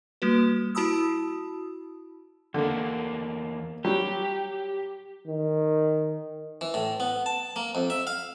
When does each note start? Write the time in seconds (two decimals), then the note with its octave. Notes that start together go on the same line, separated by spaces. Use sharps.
0.22 G3 A#3 F#4 B4
0.75 E4 F#4 A5 B5 D#6 E6
2.54 E2 D3 A#3
3.85 F#3 G3 G4
5.27 D#3
6.61 E3
6.74 A2
7.00 B3
7.26 A5
7.56 A#3
7.75 F2
7.90 E5
8.07 F5